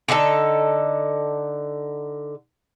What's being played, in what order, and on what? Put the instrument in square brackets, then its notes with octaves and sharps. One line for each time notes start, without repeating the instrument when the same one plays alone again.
[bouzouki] D3 D#4 F4 A4